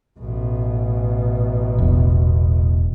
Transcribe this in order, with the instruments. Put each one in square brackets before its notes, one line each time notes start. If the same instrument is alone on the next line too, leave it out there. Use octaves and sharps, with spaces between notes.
[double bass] A1 B2
[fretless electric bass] E1